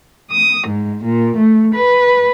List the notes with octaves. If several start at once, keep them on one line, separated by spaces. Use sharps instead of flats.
D#6
G#2
A#2
A3
B4